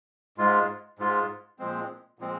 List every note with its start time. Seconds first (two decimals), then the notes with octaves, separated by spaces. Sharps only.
0.38 G#2 G#3 F4
0.99 G#2 G#3 F4
1.59 A#2 F3 G#3 C4
2.19 A#2 F3 G#3 C4